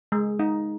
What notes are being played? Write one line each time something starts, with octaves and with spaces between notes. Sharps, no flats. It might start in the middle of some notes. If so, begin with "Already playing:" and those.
G#3
D#4